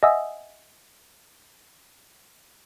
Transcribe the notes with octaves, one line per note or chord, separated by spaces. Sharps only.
D#5 E5 F#5 G#5 D#6 E6